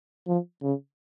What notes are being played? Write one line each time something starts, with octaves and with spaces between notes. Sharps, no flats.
F3
C#3